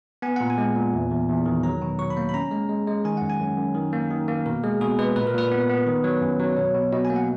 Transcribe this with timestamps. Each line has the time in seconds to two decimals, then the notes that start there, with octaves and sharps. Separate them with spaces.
0.22 B3 G#5
0.36 A#2 F#5
0.50 G#5
0.58 G#3
0.76 A#2
0.94 E2
1.11 E2
1.28 E2
1.46 D#3
1.63 F#3 A#5
1.82 B2
1.99 F#3 C#6
2.10 B5
2.17 A#3
2.29 B5
2.34 C#4 A#5
2.51 G#3
2.69 G#3
2.87 G#3
3.05 D#3 G#5
3.17 F#2 F#5
3.30 G#5
3.40 F#2
3.57 F#2
3.75 D#3
3.93 A#3
4.11 D#3
4.28 A#3
4.46 B2 A#4
4.63 G#3 G#4
4.81 B2 G#4
4.98 G#3 B4
5.16 A#2 B4
5.27 A#4
5.34 A#2 B4
5.52 B3
5.69 B3
5.87 D#3
6.04 F#3
6.22 F#2
6.40 F#3
6.57 B2 C#5
6.74 B2
6.92 B2 D#5
7.05 G#5
7.10 A#3
7.16 F#5